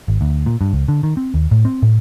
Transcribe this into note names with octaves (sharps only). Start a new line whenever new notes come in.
G#1
D2
A#2
G2
C#2
D3
D#3
C4
D#2
A2
C4
A2